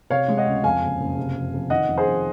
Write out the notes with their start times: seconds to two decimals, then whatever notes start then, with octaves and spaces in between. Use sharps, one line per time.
0.10 C3 C#5 F5
0.28 G#3
0.37 D#5 F#5
0.47 C#2
0.64 F2 F5 G#5
0.82 F#1
1.00 F#1
1.18 C3
1.35 F2
1.53 F2
1.70 D#3 D#5 F#5
1.88 F2
1.98 G#4 C5
2.07 F2